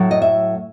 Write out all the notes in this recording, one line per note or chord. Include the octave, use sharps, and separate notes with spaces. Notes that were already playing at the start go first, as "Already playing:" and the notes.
Already playing: A2 F#3 A3
D#5
E5